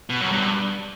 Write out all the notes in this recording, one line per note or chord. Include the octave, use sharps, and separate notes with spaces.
B2
F#2
G2